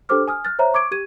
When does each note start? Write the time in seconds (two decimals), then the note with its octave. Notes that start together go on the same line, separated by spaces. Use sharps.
0.09 D4 G4 A4 C5 D6 F6
0.28 G#5 D#6 F6
0.45 F6 F#6 A6
0.59 C5 C#5 E5 A#5
0.74 C#6 D6 G#6 D7
0.91 G4 G#6 D#7